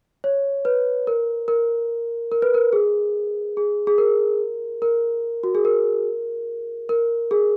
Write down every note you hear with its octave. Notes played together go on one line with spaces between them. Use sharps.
C#5
B4
A#4
A#4
A#4
B4
A#4
G#4
G#4
G#4
A#4
A#4
F#4
G#4
A#4
A#4
G#4